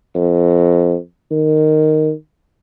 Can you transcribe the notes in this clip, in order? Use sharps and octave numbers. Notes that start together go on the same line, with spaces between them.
F2
D#3